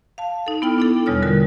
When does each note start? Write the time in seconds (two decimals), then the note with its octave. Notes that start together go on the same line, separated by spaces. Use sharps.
0.18 F5 A5
0.46 D#4 A4
0.62 B3 E4 G5 F6
0.78 D4 E4 A4
1.06 E2 B2 G3 C#5 F6
1.22 D3 G3 F4 A#4